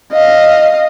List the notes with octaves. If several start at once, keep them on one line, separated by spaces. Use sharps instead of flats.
D#5 F5